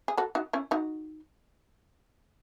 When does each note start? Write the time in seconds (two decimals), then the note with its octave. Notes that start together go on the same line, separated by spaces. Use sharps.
0.08 G#4
0.17 F#4 A4
0.35 D#4 F#4
0.53 C#4 E4
0.71 D#4 F#4